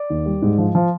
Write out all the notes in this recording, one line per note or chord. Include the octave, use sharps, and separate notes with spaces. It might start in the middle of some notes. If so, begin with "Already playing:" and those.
Already playing: D5
D#2
G3
G#2
F3
F3